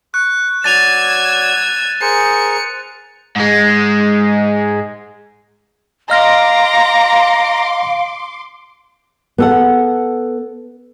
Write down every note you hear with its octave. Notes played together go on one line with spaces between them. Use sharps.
C#6 F#6
F#3 D5 E6 G#6 A6 D#7 F7
G#4 A#4 C5 C#7
G#2 G#3
D#5 F5 A#5 C6 D6 F6 A#6
B3 A4 F#5